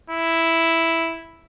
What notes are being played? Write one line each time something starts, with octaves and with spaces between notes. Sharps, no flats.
E4